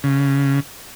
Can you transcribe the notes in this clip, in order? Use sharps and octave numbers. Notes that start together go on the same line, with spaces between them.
C#3